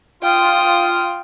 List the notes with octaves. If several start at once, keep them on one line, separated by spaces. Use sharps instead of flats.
F4 G5 D#6